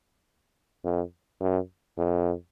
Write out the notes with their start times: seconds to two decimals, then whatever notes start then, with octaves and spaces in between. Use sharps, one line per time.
0.84 F2
1.40 F#2
1.98 F2